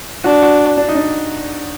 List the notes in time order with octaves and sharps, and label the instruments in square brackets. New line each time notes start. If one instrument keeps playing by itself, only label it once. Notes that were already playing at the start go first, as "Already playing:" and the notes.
[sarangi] D4 [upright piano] F#4
[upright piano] F#4
D4
D#4
D4